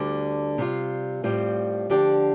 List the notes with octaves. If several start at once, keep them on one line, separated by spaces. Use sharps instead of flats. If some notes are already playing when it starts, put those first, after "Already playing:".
Already playing: D2 D3 G3
C3 G3 F4
A2 G3 C4 F4
D3 F3 D4 G4